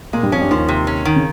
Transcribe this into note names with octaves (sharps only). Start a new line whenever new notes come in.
A#2 G#3 A#3
G2 G3
F2 F3 C#4
G2 G3
D#2 D#3 F3
C3
C#4
D#3
C#3